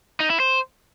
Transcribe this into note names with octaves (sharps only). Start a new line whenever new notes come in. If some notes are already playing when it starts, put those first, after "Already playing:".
D#4
E4
C5